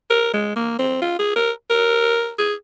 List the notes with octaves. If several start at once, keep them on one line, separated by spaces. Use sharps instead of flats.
A#4
G#3
A#3
C4
F4
G#4
A#4
A#4
G#4